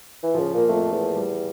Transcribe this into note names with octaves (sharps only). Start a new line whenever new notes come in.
E3
C#3 F3
A#2 A#3
F2 A3
E2
G3